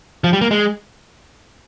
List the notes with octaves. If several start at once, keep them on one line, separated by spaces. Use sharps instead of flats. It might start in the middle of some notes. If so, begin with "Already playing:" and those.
F3
G3
A#3
G#3